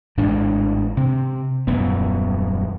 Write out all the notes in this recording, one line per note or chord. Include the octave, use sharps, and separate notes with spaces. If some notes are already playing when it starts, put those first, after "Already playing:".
G#1 A2 G#3 D4
C3 C4
D#1 F#2 B3